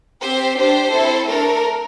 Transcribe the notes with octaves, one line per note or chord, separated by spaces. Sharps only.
C4 G4 C5
D4 G4 C5
C4 E4 A4
A3 D4 A4 A#4